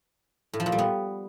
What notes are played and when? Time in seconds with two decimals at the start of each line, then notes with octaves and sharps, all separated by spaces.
0.53 A2
0.60 F3
0.66 A#2
0.72 G3
0.79 B3